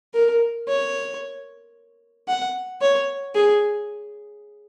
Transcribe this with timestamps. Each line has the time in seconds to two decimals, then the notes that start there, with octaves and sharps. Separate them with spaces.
0.14 A#4
0.68 C#5
2.28 F#5
2.81 C#5
3.34 G#4